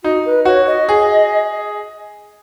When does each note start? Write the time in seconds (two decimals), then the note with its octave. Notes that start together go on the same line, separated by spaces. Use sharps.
0.04 D#4 F#4
0.25 B4
0.45 F#4 C#5
0.67 D#5
0.89 G#4